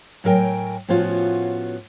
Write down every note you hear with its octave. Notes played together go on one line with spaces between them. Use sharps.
A2 F#3 A#4 G5 G#5
A2 F3 B3 C#4 F4 F#4